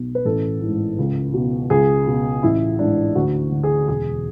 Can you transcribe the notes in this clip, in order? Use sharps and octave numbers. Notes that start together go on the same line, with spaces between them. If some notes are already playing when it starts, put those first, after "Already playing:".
Already playing: B1 B2
B4
A1 A4
G#2 E3
C#2
B2
C#2 G#4
B2
A1 E4
G#2 E3 D4
D2 F#4
D3
G#4
E1 G#4